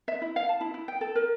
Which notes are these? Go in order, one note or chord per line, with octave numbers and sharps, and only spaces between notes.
E5
E4
F5
A5
E4
E4
G5
A4
A#4